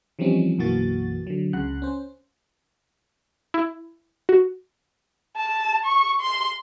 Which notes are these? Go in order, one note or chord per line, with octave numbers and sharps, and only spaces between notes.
E3 F3 G3 C4 C#4 D#4
B1 F#2 E3 A#3 F#4 A6
D3 F#3
C#2 C#3 F#5 F#6
C#4 C5
E4
F#4
A5
C#6
C6